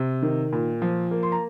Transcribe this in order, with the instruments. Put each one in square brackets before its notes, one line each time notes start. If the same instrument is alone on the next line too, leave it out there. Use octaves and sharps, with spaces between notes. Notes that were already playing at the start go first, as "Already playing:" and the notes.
Already playing: [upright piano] C3
D#3
A#2
F3
A#3
C6
A#5